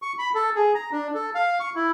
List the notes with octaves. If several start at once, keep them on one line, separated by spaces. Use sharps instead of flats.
C#6
B5
A4
G#4
A#5
D4
A4
F5
C#6
E4